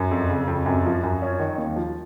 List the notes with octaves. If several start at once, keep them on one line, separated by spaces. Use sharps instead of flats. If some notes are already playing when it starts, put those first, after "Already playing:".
Already playing: F#2
F2
C#3
F2
F#2
F3
F#2
C#4
D#3
D#2
F3